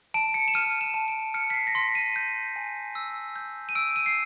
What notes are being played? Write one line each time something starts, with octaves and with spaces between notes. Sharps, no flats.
A5 D7
C#7
E7
F6 D#7
E7
A5
D7
F6 C#7
B6
C7
A#6
C6 B6
D#7
G6
G#5
E6
G6
D#7
E6 D7
D#7
C7